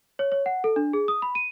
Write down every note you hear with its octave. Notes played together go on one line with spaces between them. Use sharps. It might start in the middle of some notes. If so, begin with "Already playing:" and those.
C#5
C#5
F#5
A4
D4
G#4
D#6
B5
D#7